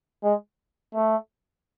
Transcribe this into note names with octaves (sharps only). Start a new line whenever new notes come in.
G#3
A3